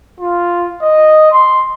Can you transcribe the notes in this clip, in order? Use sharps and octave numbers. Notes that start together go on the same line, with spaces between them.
F4
D#5
C6